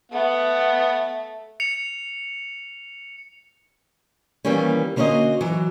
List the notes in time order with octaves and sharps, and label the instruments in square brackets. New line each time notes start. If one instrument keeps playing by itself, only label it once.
[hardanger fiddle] A3 [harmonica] B3 F#5
[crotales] C#7 F7
[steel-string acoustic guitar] D#3 E3 G3 A#3 B3 C#4
D3 A#3 C#4 F#4 C5 D#5
E3 F#3